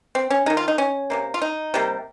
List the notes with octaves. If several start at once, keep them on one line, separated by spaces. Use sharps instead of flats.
C4
C#4
G#3 D#4
D#3
F4
D#4
C#4
C3 D#3 A#3
F4
D#4
C3 G3 A#3